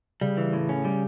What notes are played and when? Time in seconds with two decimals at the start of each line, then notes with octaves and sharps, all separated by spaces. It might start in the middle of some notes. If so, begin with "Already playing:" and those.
0.21 C#3 G3
0.37 E3
0.53 A2
0.69 C#4
0.85 G3